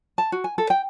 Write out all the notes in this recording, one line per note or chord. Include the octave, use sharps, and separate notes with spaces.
A5
F#4
G#5
A4
G5